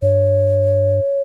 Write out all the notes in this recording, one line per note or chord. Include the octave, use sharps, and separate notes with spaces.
G2 C#5